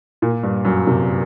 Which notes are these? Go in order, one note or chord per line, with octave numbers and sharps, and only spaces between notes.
A#2
G2
F#2
C3